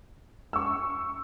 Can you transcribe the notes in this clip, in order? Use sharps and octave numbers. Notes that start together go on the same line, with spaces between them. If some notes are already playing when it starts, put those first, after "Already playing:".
C#6 E6